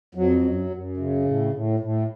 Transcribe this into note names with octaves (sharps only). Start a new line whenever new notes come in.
F2 F#3
F#2
F#2
C#3
A2
A2
A2